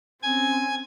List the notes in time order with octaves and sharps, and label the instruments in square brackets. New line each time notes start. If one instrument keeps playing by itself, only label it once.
[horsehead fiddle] C4 C#4 [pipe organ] G#5 G#6